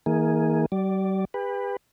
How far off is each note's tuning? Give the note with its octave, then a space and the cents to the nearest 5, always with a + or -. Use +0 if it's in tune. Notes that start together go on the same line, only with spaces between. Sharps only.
E3 -45 A#3 +0 G#4 +0
G3 -45 D5 +0
G4 +40 B4 +0